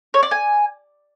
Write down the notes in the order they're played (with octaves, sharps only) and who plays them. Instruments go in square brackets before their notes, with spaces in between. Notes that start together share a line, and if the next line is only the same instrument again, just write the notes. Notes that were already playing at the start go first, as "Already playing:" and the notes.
[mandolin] C#5
D5
G#5